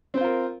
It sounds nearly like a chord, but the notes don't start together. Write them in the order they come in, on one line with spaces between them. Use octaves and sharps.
C4 C5 F4 A#4